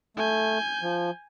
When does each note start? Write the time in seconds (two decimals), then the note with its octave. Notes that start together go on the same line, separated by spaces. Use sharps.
0.17 A3 G#5 G6
0.82 F3